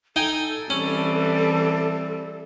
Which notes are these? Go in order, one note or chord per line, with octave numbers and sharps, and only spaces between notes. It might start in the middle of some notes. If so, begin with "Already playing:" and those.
D#4 A4 G5 G#5
E3 G3 C4 C#4